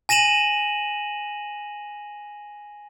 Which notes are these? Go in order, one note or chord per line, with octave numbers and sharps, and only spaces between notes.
G#5 A#6 D#7 E7 F#7